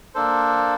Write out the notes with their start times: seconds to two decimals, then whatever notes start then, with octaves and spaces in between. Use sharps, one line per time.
0.15 A#3 D4 A4 C5